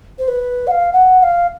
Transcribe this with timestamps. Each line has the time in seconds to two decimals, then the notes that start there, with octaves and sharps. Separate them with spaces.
0.19 C5
0.28 B4
0.67 F#5
0.70 F5
0.93 F#5
1.19 F#5
1.22 F5